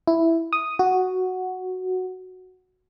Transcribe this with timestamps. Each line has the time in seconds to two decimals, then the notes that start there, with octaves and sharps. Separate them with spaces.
0.07 E4
0.53 D#6
0.79 F#4